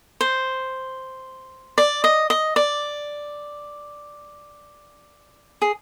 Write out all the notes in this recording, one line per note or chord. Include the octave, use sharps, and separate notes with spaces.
C5
D5
D#5
D#5
D5
G#4